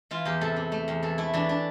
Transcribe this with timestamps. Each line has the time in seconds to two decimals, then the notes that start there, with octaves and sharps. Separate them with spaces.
0.11 E3 F4
0.25 E2 G4
0.41 C3 A4
0.56 C3
0.72 A3
0.88 E2
1.03 E3 A4
1.18 A3 E4
1.34 E3 D4
1.49 D4